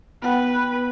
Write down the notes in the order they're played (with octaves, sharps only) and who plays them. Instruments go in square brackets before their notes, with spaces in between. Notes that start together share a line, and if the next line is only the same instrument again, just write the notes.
[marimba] B3 F#5 G5 [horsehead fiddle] B4